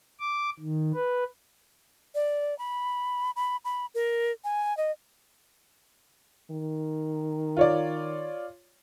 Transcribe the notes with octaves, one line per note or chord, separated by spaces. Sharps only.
D6
D#3
B4
D5
B5
B5
B5
A#4
G#5
D#5
D#3
F4 C#5 D5